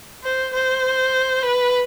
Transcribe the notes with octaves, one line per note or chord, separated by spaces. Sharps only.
C5
C5
B4